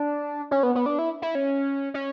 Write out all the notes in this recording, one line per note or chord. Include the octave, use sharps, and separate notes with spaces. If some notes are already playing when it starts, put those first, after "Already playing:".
Already playing: D4
C#4
B3
B3
D4
E4
E4
C#4
C#4